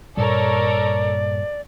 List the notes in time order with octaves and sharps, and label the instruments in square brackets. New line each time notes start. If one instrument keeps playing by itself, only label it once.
[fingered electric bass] G2 A#2 G3 [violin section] A4 A#4 C#5 [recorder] D5